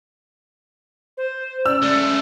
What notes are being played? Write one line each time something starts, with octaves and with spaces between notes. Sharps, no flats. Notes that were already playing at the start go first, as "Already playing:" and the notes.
C5
C#4 D5 E6
G#3 A3 D5